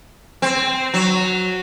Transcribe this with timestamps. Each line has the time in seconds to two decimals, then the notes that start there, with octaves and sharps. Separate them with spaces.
0.42 C4
0.94 F#3